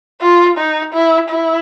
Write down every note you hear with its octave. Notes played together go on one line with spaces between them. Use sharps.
F4
D#4
E4
E4